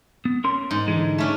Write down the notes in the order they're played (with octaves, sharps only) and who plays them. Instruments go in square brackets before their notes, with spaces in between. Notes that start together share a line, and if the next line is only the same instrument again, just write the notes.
[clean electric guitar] B3
C#4 A#4 C6
[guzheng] G#2
[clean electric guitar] D3 E3 G#3
[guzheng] A3 C#4 D4